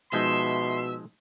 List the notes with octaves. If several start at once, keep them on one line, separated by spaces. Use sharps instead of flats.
B2 F3 G#3 D#4 E5 C6